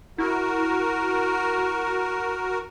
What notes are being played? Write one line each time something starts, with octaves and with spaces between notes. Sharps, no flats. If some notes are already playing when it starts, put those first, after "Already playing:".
E4 F#4 A#4